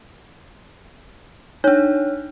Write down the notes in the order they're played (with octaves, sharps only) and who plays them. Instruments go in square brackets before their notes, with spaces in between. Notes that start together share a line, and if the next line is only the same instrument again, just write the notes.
[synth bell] D4 D#4 [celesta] C#5